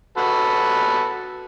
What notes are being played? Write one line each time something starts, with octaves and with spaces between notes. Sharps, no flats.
F#4 A4 B4